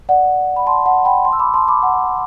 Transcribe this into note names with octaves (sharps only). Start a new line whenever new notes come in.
D5 F#5
B5
A5 C6
F#5 A5
G5 B5
A5 C6
E6
B5 D6
A5 C6
B5 D6
F#5 A5